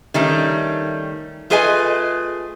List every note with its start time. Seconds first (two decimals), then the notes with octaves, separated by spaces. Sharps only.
0.14 D#3 G3 A3 C#4
1.50 A3 F4 G#4 B4 D#5 G#5